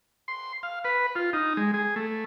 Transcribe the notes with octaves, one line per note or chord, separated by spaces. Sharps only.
C6
F5
B4
F4
D#4
G#3
G#4
A3